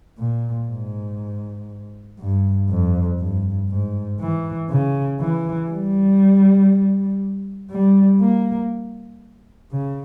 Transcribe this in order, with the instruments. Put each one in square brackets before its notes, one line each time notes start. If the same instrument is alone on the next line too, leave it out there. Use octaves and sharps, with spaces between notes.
[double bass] A#2
G#2
G2
F2
G2
G#2
E3
C#3
E3
G3
G3
A#3
C#3